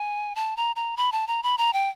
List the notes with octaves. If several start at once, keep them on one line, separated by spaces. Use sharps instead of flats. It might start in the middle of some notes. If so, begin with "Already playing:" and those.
Already playing: G#5
A5
A#5
A#5
B5
A5
A#5
B5
A#5
G5